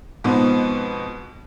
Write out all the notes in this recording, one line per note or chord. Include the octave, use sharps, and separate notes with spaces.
G#2 B2 F3 B3 C4 D#4